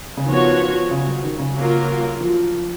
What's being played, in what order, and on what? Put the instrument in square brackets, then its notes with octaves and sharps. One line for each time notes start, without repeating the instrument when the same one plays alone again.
[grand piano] C#3
[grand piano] D#3 [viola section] F3 B3 F#4 C#5
[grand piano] C#3
F#3
D#3
C#3
[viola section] F#3 A#3 F4 A#4
[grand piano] F3